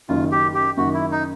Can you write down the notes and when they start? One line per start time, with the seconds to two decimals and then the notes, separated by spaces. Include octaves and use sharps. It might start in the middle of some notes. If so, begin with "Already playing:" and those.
0.09 F#1 F#2 D#3 F4
0.31 G4
0.54 G4
0.77 F#1 F#2 D#3 F#4
0.94 E4
1.12 D#4